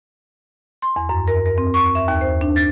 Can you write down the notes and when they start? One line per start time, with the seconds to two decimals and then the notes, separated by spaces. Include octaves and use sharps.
0.82 C6
0.96 E2
1.09 F#2
1.28 A#4
1.46 A#4
1.58 C4
1.74 C#6
1.95 E5
2.08 D#2
2.21 C5
2.41 D4
2.56 A6